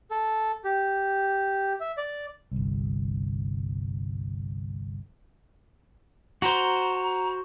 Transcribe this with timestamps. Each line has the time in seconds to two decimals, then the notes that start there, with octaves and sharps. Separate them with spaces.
0.11 A4
0.64 G4
1.80 E5
1.97 D5
2.52 G1 C2
6.42 F#4 C5 A#5